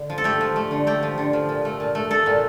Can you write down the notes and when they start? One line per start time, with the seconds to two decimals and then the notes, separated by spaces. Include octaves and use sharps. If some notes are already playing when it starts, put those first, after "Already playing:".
Already playing: D3
0.10 F3
0.18 A4
0.24 A3 G4
0.41 F3
0.56 A3
0.71 D3
0.87 A3 G4
1.03 F3
1.18 D3
1.33 F3
1.49 A#2
1.65 A3
1.80 A#2
1.95 A3
2.11 A3 A4
2.26 A#2